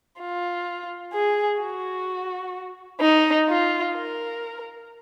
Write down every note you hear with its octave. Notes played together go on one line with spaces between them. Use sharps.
F4
G#4
F#4
D#4
F4
A#4